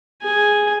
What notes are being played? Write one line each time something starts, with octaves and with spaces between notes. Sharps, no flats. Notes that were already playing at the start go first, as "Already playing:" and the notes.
G#4 G#5